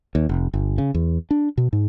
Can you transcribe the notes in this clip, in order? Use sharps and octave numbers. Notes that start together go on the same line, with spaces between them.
D#2
F1
G1
C#3
E2
D4
B2
G#2